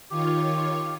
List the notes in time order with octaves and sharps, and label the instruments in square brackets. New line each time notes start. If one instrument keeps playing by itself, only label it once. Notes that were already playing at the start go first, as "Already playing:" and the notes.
[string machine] D#3 F4 C#5 [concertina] G4